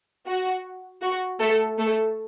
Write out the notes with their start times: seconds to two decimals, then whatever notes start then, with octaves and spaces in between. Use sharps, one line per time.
0.26 F#4
1.02 F#4
1.40 A3 A4
1.78 A3 A4